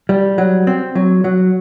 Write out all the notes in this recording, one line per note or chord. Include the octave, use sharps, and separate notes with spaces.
G3
F#3
C4
F#3
F#3